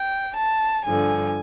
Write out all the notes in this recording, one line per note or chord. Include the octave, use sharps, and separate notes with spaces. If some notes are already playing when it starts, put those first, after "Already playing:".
Already playing: G5
A5
G2 D3 F3 G#5